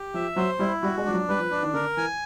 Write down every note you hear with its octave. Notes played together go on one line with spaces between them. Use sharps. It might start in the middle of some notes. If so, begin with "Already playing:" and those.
Already playing: G4
F3 E5
F#3 C5
G3 E4
G3 F#4
G#3
F3 D4
F#3
G3 B4
F3
F3 D4
D#3
D3 A#4
E3 G#5